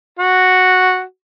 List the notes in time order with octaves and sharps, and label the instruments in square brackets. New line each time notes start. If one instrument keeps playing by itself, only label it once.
[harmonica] F#4